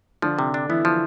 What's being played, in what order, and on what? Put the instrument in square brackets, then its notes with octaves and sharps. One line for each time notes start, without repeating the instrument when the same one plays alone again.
[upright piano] D3 D4 [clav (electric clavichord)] F3
[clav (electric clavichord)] C3
D4
[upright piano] E3 E4 [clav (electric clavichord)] B3
[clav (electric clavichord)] F3